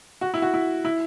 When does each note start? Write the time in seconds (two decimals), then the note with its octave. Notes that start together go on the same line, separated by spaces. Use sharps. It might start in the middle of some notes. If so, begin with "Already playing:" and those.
0.21 F#4
0.34 E4
0.42 F#4
0.54 E4
0.85 E4